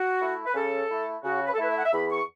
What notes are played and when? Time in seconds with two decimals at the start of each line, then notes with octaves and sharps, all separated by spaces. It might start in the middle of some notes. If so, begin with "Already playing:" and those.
Already playing: F#4
0.20 A3 E4
0.46 B4
0.54 C#3 A4
0.90 A3 E4
1.23 C#3 F#4
1.46 B4
1.53 A4
1.58 A3 E4 B4
1.70 E5
1.76 F#5
1.84 E5
1.93 E2 B5
2.10 C#6